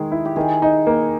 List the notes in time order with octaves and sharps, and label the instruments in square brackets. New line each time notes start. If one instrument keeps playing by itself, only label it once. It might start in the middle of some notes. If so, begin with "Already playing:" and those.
Already playing: [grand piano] D#3 G#3 [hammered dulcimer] G#4
[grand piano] E4
[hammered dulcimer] G4
[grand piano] D#3 [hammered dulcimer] G#4
[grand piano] D#4
A#3